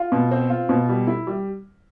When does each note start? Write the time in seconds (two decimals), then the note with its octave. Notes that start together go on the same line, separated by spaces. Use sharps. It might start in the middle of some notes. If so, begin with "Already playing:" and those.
Already playing: F4
0.12 B2
0.31 C4
0.50 F4
0.69 B2
0.89 G3
1.07 E4
1.27 G3